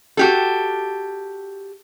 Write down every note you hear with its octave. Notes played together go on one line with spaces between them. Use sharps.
F#4 G4 A4